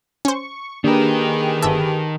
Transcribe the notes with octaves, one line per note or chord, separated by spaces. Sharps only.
C#4 C5 C#6
D#3 A#3 D4 G4 G#4 A#4 B4
G1 E5 A5